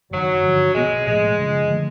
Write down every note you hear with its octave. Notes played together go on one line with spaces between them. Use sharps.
F#1 F#2 D#3 F#3
G2 D3 F3
B1 B2 G3 G#3 B3
B1 A2 F3 G#3 A3
F#1 E2 C#3 F3
D3 F3 A3